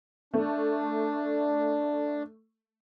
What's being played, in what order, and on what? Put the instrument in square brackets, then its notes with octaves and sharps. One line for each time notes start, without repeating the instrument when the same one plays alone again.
[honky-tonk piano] A3 [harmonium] D4